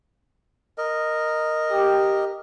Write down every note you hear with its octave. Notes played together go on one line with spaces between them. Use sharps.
A#4 D#5
G4